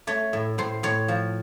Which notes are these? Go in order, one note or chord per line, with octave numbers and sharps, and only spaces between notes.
A3 C#5
A2
A2 C5
A2 C#5
F3